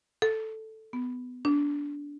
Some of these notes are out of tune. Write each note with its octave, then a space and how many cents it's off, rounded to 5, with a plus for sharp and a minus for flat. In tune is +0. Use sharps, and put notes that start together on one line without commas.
A4 +0
B3 +15
D4 -20